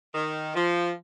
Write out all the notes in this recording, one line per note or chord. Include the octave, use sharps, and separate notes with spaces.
D#3
F3